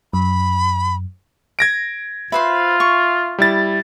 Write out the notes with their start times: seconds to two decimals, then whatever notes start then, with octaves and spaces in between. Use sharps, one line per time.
0.13 F#2 B5
1.59 G#6 A#6 D7
2.32 F4 B4 C5 E5 C6
2.80 C#6
3.38 G3 E4 A6